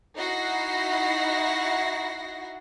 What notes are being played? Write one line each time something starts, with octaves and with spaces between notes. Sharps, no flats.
D#4 E4 F#4 F#5 A#6 C7